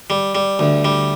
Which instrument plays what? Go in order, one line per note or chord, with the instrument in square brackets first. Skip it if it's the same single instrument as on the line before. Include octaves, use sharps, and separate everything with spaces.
[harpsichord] G3
G3
D2
G3